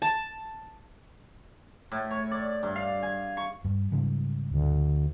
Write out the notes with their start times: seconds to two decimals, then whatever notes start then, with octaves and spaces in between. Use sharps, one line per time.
0.02 A5
1.92 A2
2.11 C#5
2.31 D5
2.63 G2
2.76 F5
3.03 G#5
3.37 C#6
3.65 G2
3.92 G#2 C#3 G3
4.51 D2